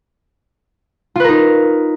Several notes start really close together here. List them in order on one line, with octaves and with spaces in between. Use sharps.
F4 B4 A#4 D#4